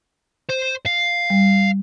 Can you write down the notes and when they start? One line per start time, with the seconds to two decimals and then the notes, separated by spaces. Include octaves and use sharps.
0.49 C5
0.86 F5
1.30 G3